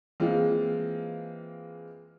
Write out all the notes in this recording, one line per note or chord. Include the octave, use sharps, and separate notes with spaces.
E3 G#3 A#3 C4 F4